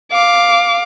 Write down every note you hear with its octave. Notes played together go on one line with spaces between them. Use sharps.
F5 D6